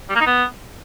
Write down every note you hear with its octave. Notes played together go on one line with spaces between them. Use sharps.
G3
A#3
D#4
B3